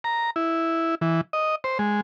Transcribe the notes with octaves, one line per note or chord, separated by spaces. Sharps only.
A#5
E4
E3
D#5
C5
G#3